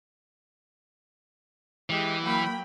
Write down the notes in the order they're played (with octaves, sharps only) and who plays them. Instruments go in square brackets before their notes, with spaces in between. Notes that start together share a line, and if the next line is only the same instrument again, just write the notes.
[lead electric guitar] E3 [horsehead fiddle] G#3 G4
[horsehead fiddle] F#3 G5 [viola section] A#3 B5